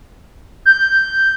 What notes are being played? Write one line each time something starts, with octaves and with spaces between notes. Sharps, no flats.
G6